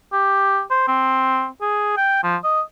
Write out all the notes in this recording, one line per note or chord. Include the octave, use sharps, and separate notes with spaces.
G4
C5
C4
G#4
G5
F3
D#5